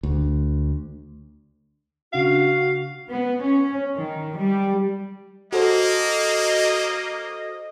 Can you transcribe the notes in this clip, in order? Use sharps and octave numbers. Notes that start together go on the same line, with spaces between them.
D2
C#3 D4 F#4 F5 F#5
B3
C#4
D#3
G3
A#3 F#4 A4 C5 D#5